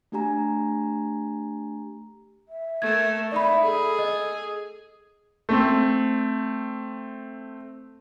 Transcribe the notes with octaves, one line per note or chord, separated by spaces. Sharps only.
A3 D4 G4 G#5 A#5
E5
A3 A#4 G#6
D#4 D5 E5 B5
G#4 A4
D#5
A3 C4